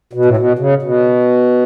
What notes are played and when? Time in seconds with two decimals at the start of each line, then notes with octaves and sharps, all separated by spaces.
0.13 B2
0.25 A2
0.37 B2
0.59 C#3
0.82 B2